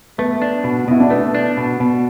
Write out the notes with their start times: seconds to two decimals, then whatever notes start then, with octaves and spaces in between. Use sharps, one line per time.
0.18 A3 B3
0.42 D4
0.64 B2
0.88 B2 E4
1.00 D4
1.10 A3 B3
1.35 D4
1.57 B2
1.80 B2